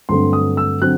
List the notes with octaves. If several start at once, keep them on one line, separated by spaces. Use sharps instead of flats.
G2 D3 F#3 A3 C4 C6
D#6
E6
D3 F#3 C4 F#6